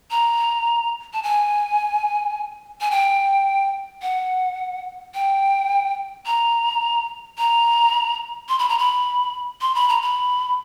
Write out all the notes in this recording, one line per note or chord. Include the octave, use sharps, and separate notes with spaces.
A#5
A5
G#5
G#5
G5
F#5
G5
A#5
A#5
C6
B5
A#5
B5
C6
B5
A#5
B5